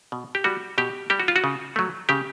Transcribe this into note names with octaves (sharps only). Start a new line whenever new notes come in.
B2
G4
G3 F#4
B2 G4
G3 G4
F#4
F4
F#4
C#3
F#3 A3
C#3 G4